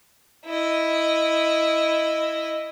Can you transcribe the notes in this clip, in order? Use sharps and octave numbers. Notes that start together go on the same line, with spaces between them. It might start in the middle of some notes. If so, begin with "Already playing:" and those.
E4 D#5